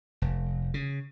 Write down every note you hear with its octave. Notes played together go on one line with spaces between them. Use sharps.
F1
C#3